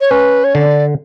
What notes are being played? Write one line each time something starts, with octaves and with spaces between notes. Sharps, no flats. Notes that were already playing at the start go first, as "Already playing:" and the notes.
C#5
C#4 B4
C#5
D3 D5